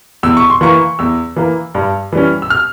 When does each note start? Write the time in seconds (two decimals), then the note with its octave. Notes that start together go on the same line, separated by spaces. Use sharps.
0.23 E2 E6
0.37 C#6
0.50 C6
0.61 E3 A#3 C#6
0.99 E2 E6
1.37 E3 A#3
1.75 G2
2.13 E3 G3 C#4
2.42 E6
2.50 F6